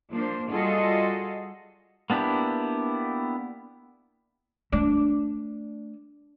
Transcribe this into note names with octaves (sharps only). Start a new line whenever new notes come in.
F3 A#3 D4 C5
G3 F4 F#4 G#4 A4 D#5
A#3 B3 D4 E4 G4
A3 D4